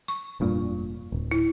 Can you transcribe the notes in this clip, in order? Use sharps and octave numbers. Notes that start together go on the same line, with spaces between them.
C#6
F1 G2 A#2
D1
E4